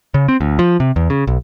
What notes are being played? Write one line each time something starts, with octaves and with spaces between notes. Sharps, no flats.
C#3
C4
D2
F3
C3
E2
C#3
B1